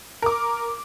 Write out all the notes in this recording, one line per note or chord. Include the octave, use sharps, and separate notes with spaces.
A#4 D6